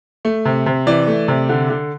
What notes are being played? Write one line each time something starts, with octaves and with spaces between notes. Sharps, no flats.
A3
C3
C3
E3 D5
A3
C3
D3
D3